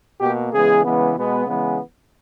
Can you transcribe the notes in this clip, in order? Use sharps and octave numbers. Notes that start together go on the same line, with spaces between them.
B2 A#3 G4
C#3 E3 G#3 B3 G#4
C#3 E3 G#3 B3
B2 G#3 B3
C#3 E3 G#3 B3